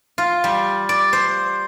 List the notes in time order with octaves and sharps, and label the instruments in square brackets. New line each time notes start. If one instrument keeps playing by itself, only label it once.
[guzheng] F4
G3
D5
C5